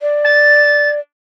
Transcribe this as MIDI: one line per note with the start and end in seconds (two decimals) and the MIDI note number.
0.01 1.00 74
0.24 0.90 93